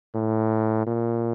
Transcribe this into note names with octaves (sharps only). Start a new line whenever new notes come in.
A2
A#2